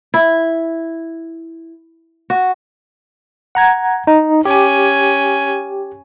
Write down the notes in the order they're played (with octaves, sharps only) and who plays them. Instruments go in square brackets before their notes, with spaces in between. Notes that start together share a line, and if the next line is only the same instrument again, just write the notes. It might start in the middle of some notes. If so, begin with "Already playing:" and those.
[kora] E4
F#4
[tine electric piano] F#5 A#5 G#6
D#4
[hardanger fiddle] C#4 G#5 [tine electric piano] G4